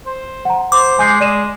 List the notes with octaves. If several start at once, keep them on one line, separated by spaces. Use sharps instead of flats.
C5
F#5 A#5
C5 D6
G#3 G#5 G6 C7
G#3 D5 D#7 E7